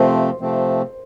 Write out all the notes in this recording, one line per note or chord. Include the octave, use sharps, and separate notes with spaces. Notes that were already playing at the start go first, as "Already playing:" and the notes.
Already playing: C3 F3 A3 C4 C5
C3 F3 A3 C4